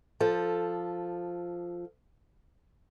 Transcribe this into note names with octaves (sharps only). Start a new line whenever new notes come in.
F3 A4